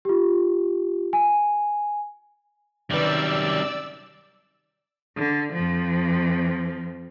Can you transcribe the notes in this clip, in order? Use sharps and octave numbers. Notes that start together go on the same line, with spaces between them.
F4 G4
G#5
F#2 C3 D#3 G3 B4 D5 E6
D3
F2 F3